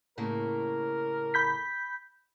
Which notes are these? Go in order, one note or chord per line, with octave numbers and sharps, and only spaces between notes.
A2 C#3 A#3 A#4
B5 G6 B6